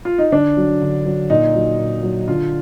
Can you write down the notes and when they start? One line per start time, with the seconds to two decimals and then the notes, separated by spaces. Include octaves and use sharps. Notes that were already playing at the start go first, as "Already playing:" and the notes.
0.05 F4
0.18 D#4
0.32 D3 D4
0.57 F#3
0.82 D3
1.06 F#3
1.30 A#2 D#4
1.55 F#3
1.79 A#2
2.03 F#3
2.28 D3 F4